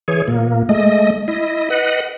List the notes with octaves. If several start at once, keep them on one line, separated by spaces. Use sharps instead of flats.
E3 G#4 C#5
A#2 A#3
G#3 A3 D#5
E4 D#5
B4 D#5 F#5